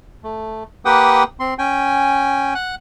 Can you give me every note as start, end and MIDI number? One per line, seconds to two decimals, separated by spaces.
0.23 0.64 57
0.85 1.24 58
0.85 1.24 67
0.85 1.24 71
0.85 1.24 78
0.85 1.24 79
0.85 1.24 87
1.40 1.54 60
1.40 1.54 84
1.59 2.54 61
1.59 2.54 79
1.59 2.54 80
2.55 2.75 78
2.55 2.75 90